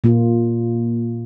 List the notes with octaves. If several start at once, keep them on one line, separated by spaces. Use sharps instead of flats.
A#2 A#3 F4